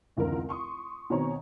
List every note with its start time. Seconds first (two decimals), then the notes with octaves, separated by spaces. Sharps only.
0.17 F1 C#2 D3 E3 E4 A#4
0.49 C6 C#6 D#6
1.10 B2 D#3 C4 C#5 A#5 C#6